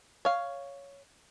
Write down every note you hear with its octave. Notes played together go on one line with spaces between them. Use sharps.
C#5 F5